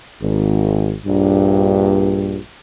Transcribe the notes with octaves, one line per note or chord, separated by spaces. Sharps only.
G#1
A#1 G2